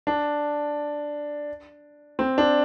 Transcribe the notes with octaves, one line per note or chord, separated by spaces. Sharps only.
D4
C4
D4